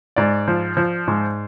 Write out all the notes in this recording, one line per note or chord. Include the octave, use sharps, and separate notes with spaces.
G#2 D5
F3
F3
G#2